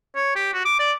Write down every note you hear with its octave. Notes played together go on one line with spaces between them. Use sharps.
C#5
G4
F#4
D6
D5